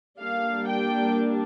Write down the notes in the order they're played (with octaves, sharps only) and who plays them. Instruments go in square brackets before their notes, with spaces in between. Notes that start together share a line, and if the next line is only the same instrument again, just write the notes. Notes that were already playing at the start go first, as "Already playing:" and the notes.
[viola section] G3 A#3 D4 F5
G5